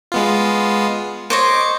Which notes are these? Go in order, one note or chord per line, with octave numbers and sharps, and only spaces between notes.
G#3 B3 F4
C5 C#5 D#5 D6 C#7